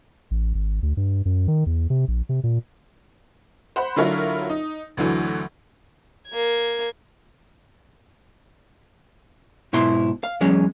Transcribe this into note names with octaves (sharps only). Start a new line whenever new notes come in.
A1
G#1
D2
G2
F#2
D#3
E2
C3
A#1
C3
A#2
C5 F#5 B5
D3 F#3 E4 F4 A#4 C#5
D#4
D2 D3 E3 F#3
A#3 G#6
G#2 B2 E4 C6
F5
E2 F#3 G#3 C#4